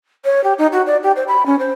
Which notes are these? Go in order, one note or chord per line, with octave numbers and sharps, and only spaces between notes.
C#5
G4
D#4
F#4
D5
G4
C5
B5
C#4
C5